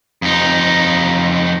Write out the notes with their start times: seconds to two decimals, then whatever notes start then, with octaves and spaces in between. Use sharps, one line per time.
0.22 F2 D#4